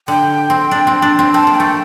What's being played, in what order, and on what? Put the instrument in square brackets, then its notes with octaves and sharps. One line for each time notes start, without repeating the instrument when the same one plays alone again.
[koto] D3 [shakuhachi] G5
[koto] C4
D4
C4
D4
C4
[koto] C4 [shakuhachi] A5
[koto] A#3
[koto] A3 [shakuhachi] G5